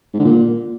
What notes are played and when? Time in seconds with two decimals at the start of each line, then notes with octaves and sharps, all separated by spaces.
0.14 G#2
0.19 D3
0.25 A#2